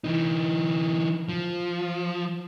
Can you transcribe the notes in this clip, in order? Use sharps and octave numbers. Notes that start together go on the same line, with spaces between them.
E3 D#4
F3